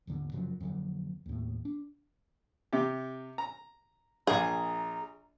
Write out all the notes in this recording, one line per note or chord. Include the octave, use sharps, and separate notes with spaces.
D#1 G#1 D3
F#2 C#3 F3 F#3
F2 D3 F#3
D#2 A2
D4
C3 G4
A#5
A#1 G#4 F5 A#5